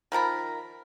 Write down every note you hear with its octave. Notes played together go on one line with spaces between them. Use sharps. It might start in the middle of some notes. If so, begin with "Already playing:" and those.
D#3 F3 A#4 B5